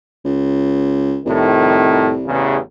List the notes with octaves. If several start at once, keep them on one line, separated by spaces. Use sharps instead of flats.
C#2
C2 F2 A2 D#3
A1 E2 C#3